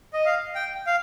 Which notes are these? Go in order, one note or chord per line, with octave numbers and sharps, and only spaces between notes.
D#5
F5
G5
F5